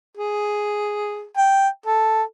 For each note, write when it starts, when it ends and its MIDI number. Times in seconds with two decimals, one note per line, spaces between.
0.17 1.25 68
1.37 1.68 79
1.86 2.23 69